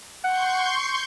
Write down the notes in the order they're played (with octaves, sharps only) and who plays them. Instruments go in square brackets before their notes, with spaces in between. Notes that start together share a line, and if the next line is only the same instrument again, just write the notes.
[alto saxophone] F#5 [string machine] C6 C#6 G6